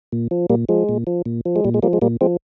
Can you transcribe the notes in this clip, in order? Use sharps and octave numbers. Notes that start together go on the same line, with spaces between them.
A#2
F3
A#2 G3 A#3
F3 G#3
A#2
F3
A#2
F3
G#3
A#2 G3
G#3
F3 G3 A#3
G#3
A#2 G3 A#3
F3 G#3 C4